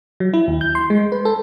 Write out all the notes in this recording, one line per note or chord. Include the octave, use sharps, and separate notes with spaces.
F#3
E4
D#2
G6
C6
G#3
B4
A4